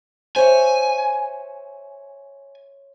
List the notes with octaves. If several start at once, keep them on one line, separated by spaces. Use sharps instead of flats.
C5 C#5 E5 G#5